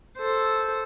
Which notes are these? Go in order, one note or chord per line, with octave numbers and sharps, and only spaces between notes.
A4 C5